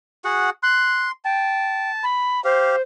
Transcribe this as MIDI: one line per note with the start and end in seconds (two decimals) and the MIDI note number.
0.25 0.50 66
0.25 0.50 68
0.25 0.50 78
0.63 1.11 84
0.63 1.09 90
1.25 1.91 79
1.25 2.05 81
2.03 2.43 83
2.44 2.76 67
2.44 2.82 72
2.44 2.76 77